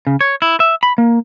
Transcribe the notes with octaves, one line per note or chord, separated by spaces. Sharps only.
C#3
C#5
E4
E5
B5
A#3